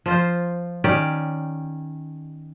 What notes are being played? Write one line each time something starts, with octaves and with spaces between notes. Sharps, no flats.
F3 F4 C5
D#3 C#4 G4 D5